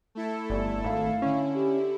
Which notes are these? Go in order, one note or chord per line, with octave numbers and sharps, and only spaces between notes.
A3 E4 A4
G1 D5
G#1 F5
D3 C#4 E4
G4